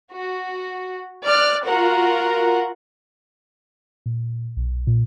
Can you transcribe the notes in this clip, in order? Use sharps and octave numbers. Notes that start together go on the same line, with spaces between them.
F#4
D5 F6 F#6
F4 F#4 A#4 F#5
A#2
B1
A#2